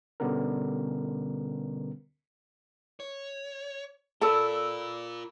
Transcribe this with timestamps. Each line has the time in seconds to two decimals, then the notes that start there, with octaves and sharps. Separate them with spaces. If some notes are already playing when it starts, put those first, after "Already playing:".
0.20 B2 D3 G3 B3 C#4 A#4
3.00 C#5
4.21 F4 A4 A#4 D5 A5 B5 E6